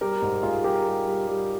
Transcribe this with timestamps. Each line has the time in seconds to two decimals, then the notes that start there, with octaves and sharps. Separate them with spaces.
0.01 G3 G4 A#4
0.22 G#2
0.43 G#2 F4 G#4
0.64 G3 G4 A#4
0.85 G3
1.06 G3
1.27 G3